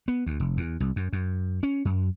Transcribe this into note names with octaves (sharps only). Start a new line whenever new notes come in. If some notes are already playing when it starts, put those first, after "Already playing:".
B3
D2
F1
E2
C2
F#2
F#2
C#4
F#2